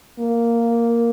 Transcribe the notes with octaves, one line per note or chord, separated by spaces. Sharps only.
A#3